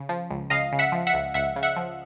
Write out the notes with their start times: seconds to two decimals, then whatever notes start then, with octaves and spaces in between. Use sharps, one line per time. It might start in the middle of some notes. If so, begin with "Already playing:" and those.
Already playing: C#3
0.09 F3
0.30 C#2
0.50 C#2 D#5 F5
0.72 C#3
0.79 E5 F#5
0.92 F3
1.07 E5 F#5
1.14 C#2
1.34 C#2 E5 F#5
1.56 C#3
1.63 E5 F#5
1.76 F3